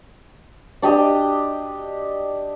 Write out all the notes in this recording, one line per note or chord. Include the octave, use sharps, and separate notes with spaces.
D4 G4 D#5